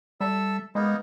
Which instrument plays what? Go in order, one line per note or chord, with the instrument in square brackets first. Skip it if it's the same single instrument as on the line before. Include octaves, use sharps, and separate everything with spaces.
[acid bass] G3 [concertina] A4 E5 E6
[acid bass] G#3 [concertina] A#3 B3 D#4